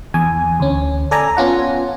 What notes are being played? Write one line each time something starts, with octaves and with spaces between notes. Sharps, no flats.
E2 G#5
D2 C#4
A4 D5 G#5 A#5
B3 C#4 F4 F#5